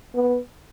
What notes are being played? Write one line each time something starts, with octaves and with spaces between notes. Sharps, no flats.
B3